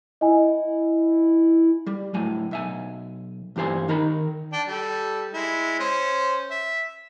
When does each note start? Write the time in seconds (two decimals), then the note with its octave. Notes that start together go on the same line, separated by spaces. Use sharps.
0.21 E4 D#5 G#5
1.86 G3 G4
2.14 A2 F#3 G#5
2.51 B1 E5 G#5
3.56 E2 G2 G4 C5 G#5
3.88 D#3 D#4 A#4 A#5 B5
4.53 D4 G5
4.68 G3 A4
5.34 G#3 E4
5.80 C#4 C5
6.51 E5